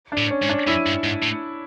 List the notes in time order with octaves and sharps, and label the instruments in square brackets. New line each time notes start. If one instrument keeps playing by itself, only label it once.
[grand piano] D4
[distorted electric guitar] A2
[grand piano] C#4
[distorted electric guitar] G#2
[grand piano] D4
[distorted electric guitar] F#2 [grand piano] E4
[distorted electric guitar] G2
G#2
A2